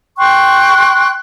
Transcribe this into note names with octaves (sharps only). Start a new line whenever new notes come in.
G5 C6 C#6 F#6